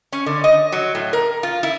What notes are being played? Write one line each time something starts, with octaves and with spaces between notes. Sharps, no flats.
C#4
D3
D#5
F#3
A2
A#4
F4
E4